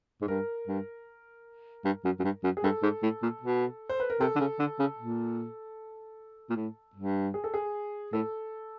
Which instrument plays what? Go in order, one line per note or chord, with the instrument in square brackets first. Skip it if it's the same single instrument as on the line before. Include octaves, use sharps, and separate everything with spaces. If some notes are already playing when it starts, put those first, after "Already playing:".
[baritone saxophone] G#2
[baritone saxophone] G2 [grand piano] A#4
[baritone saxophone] G2
G2
F#2
F#2
G2
F#2
[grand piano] G#4
[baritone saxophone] G2 [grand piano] A4
[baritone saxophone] G#2
A2
A#2
B2
[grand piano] C5
B4
A#4
[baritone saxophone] C3 [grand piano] A4
[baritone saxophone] D3
C#3
D3
C#3
A#2
A#2
A2
G2
[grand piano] G#4
A4
G#4
[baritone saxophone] A2 [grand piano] A4